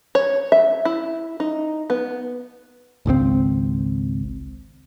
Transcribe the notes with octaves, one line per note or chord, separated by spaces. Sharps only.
C#5
E5
E4
D#4
B3
G#1 C#2 B2 C4